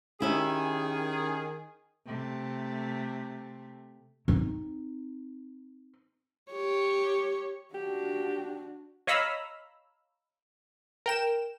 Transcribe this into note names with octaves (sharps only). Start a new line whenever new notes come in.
D#3 C#4 E4 G4 G#4
C3 A3
C4 D#4
G4 C#5
D4 F#4 G4
C#5 D#5 F5 A#5 B5 E6
A#4 G5 E7